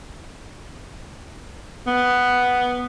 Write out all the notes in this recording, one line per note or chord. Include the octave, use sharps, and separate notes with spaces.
B3